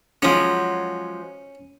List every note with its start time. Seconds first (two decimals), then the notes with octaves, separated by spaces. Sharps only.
0.22 F3 F#3 G#3 C#4